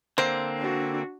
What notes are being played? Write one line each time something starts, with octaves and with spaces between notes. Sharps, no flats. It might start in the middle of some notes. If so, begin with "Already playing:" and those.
D3 A#3 C4 C5
D4 F#4